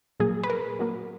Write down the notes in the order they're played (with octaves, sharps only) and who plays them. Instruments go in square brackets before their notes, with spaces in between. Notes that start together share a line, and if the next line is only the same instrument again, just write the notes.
[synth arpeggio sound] A#2 F#3 A#3 G#4
B4
A#4
A#2 F#3 A#3